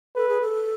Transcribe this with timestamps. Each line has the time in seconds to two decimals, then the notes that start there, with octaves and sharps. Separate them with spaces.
0.16 A4 B4
0.29 G#4
0.41 A4